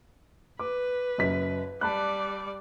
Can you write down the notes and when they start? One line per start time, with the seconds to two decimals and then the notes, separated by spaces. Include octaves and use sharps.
0.59 B4 D6
1.18 F#1 F#2 B6
1.81 G3 D5 A5 B5 F#6